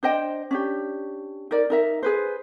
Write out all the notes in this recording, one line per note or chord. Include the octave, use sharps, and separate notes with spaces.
D4 C5 D#5 G5
C#4 D4 G4
D#4 A#4 D5
D#4 A#4 E5
G#4 B4 C5